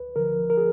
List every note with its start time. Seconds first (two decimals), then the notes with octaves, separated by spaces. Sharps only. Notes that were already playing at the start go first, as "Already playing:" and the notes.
Already playing: D2 B4
0.16 D3 F3 A#4
0.50 A#4
0.57 G#4